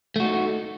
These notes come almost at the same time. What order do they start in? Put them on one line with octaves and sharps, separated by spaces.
A3 F#4 D#4